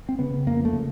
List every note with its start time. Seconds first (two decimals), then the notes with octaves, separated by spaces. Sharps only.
0.09 C4
0.19 C#3 B3
0.46 F2 A#3
0.65 A3
0.73 C#3